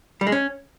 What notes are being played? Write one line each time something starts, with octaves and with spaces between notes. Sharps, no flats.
G3
G#3
C#4